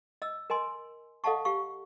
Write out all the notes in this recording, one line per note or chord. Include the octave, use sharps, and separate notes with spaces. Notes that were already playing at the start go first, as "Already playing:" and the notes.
D#5 E6
A#4 D#5 G#5 C6
A4 D#5 F5 F#5 A5 C#6
G4 F5 C#6